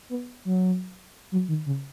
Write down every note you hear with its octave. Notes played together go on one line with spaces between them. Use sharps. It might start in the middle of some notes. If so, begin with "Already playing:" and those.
B3
F#3
F#3
D#3
C#3